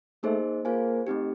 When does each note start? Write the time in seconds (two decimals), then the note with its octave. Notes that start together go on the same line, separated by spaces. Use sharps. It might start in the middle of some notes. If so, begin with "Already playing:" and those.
0.23 A3 A#3 D#4 G#4 C5 D#5
0.65 A#3 F4 G#4 C5 F5 G#5
1.07 A3 C4 D#4 G4